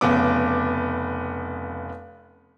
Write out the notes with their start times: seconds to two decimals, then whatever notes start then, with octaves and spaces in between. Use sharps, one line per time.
0.01 F1 C#3 B3 D6